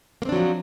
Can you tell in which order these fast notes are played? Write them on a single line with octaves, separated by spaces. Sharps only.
A#3 C4 D4 F#3 F3